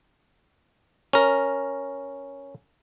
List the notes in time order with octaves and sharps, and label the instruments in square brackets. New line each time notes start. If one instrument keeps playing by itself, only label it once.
[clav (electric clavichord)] C#4 A#4